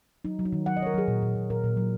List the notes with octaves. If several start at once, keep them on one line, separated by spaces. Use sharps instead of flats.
F#3 D#4
F#3
D#4
D#3
F#3 F#5
D#5
F#3 C#5
A#4
F#3 G#4
A#2
A#2
A#2
A#2 A#4
A#2
F#3